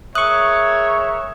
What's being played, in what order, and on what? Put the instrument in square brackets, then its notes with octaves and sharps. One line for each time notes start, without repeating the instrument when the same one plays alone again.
[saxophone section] G#3 A#4 E5 [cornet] C#5 [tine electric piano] C#6 F#6 [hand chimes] D#6